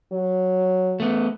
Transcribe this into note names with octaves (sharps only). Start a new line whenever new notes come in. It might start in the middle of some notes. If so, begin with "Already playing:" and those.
F#3
A3 B3